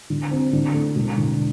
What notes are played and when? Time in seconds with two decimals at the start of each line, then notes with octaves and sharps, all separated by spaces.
0.10 D3
0.31 C4
0.53 D3
0.74 A3
0.96 E1
1.18 D3